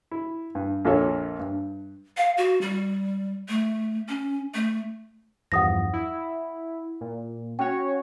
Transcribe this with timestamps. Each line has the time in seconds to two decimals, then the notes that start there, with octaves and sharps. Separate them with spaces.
0.11 E4
0.55 G2
0.85 A#1 F2 F4 A4 C#5
1.40 G2
2.17 F5
2.38 F#4
2.61 G3
3.49 A3
4.09 C#4
4.54 A3
5.52 E2 G2 F3 F#5 D#6 A#6
5.93 E4
7.01 A#2
7.59 C#4 F#4 C#5 G5